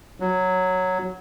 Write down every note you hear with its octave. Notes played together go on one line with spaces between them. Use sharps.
F#3